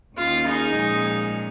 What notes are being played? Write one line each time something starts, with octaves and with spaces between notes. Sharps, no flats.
D#2 D#3 A#3 C#4 F4
D#4 G#4
A#2 F3 G#3 C#4